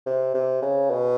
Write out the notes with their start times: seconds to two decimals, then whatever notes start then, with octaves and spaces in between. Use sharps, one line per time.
0.06 C3
0.34 C3
0.62 C#3
0.90 B2